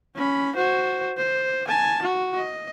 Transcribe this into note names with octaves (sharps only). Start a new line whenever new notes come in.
C#4 B5
F#4 C5
C5
G#5 A5
F#4
D#5